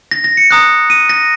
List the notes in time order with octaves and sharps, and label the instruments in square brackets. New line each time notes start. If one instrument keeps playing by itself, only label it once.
[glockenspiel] A#6
A#6
C#7
A#5 D#6 F#6
D#7
A#6